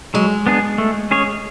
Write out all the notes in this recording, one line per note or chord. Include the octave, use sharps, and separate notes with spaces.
F#3 G#3
B3 D4 G#4
A3
C#4 G#4 C#5